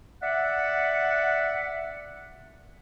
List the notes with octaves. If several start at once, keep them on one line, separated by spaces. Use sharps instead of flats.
D5 E5 F#5